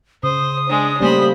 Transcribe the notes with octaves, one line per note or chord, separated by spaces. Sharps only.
C#3 C5 D#6
G#3 D4
G3 A3 A#3 C#4 C5 B5